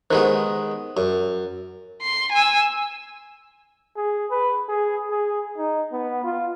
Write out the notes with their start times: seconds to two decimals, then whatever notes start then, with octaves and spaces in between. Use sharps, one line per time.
0.11 D#3 G#3 B3 G4 C5
0.97 F#2
2.02 C6
2.32 G#5 E6
3.97 G#4
4.31 B4
4.69 G#4
5.10 G#4
5.58 D#4
5.92 B3
6.24 F4